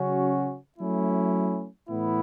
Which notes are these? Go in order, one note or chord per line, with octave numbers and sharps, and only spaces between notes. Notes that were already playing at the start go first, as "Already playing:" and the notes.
Already playing: C#3 F#3 C#4 F#4
F#3 A3 C#4 E4
A2 E3 B3 E4